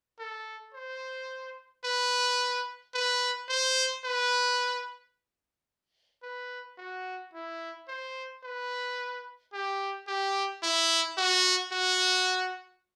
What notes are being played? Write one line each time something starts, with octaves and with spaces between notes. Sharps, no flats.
A4
C5
B4
B4
C5
B4
B4
F#4
E4
C5
B4
G4
G4
E4
F#4
F#4